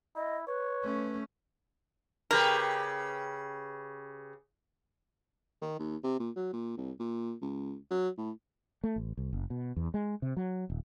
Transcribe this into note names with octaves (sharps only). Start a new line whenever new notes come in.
E4 D#5
B4 C#5
A3 C#4
C#3 G4 A#4 B4
D#3
D#2
C3
A#2
F#3
A#2
C2
A#2
C#2
F#3
A2
A3
A1
C2
F#1
B2
E2
G#3
C3
F#3
D#1